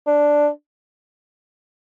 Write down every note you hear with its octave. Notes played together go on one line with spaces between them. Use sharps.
D4